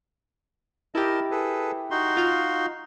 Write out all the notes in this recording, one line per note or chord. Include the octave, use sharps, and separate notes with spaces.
E4 G4 A#4 D#5 A5
G#4 A4 B4
D#4 F#4 C6
F4 F5